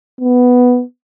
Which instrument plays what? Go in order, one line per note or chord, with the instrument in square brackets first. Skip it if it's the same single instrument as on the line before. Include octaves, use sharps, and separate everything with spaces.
[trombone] B3